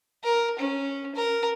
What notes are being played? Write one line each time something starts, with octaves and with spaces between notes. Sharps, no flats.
A#4
C#4
A#4